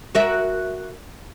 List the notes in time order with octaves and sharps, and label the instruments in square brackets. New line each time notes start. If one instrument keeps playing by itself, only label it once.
[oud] F#4 A#4 E5